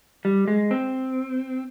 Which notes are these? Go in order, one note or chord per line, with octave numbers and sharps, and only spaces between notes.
G3
G#3
C4